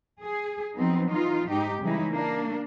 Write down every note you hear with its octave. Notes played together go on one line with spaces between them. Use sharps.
G#4
F3 F#3 B3 C4 D#4
E3 D#4 F4
G#2 D#4 G4
C#3 E3 G3 G#3 D#4 E4
A#3 D4